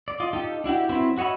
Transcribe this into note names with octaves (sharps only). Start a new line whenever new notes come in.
D5
F4 D5 D#5
D#4 F4 G4 A4
D4 E4 F#4 G4
F#3 C4 E4 F#4 B4
F#4 C#5 D#5 E5 B5